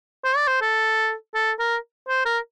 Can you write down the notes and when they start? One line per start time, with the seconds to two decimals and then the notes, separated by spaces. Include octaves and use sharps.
0.25 C5
0.37 D5
0.48 C5
0.62 A4
1.35 A4
1.60 A#4
2.09 C5
2.26 A#4